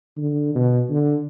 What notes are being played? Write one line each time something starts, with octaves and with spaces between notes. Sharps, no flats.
D3
B2
D3